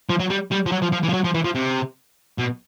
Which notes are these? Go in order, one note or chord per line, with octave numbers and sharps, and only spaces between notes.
F3
F#3
G3
G3
F3
F#3
F3
F3
E3
F3
F#3
F3
E3
F3
C3
B2